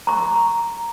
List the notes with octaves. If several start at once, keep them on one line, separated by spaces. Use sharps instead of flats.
A#5 C#6